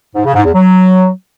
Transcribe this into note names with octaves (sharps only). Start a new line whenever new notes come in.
G#2
C#3
G#2
E2
F#3